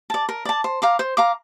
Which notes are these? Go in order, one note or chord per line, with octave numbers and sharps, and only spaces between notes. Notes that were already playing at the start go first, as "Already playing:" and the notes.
D5 A5
A#4
D5 A5
C5
F5 A#5 D6
C5
F5 A#5 D6